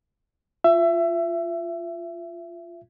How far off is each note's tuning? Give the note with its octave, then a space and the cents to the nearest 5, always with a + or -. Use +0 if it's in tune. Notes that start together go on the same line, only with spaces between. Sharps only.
F4 -5 E5 +25